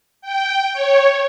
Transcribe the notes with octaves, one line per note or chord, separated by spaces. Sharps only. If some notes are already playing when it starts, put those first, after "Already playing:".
G5
C#5